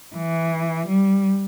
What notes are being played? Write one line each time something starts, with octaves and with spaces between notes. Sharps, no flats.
E3
G3